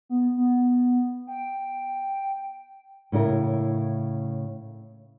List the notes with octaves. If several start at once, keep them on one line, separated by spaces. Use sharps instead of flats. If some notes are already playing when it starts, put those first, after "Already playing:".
B3
B3
G5
A2 C#3 E4 A#4